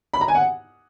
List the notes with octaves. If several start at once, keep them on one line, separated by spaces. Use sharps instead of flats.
B5
A#5
G#5
F#5